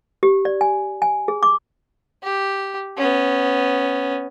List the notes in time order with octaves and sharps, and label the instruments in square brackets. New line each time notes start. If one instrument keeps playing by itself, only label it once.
[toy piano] G4
D5
G#5
G#5
G#4
D6
[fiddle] G4
B3 C#4